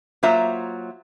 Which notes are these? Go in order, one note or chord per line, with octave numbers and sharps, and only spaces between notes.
F#3 A#3 F4 C5 E5 A#5